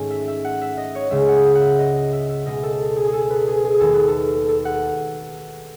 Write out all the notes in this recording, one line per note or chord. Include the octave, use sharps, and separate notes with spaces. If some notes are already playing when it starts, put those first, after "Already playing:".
Already playing: G#2 D#3 A3 C#4
E5
E5
F#5
E5
D#5
C#5
C#2 C#3 G#3 E5
F#5
E5
F#5
E5
D#5
D#5
E5
E5
C#2 B2 G#3 D#5
A4
G#4
G#4
A4
B4
G#4
G#4
D#2 D#3 A3 A4
B4
A4
A4
F#5